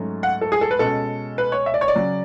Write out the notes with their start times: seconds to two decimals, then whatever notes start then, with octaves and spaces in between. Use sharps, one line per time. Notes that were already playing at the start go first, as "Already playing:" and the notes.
Already playing: G#2 F#3 A3 C#4
0.23 F#5
0.41 A4
0.52 G#4
0.61 A4
0.71 B4
0.79 B2 G#3 C#4 A4
1.38 B4
1.52 C#5
1.66 E5
1.74 D5
1.81 C#5
1.88 D5
1.96 C#3 F#3 C#4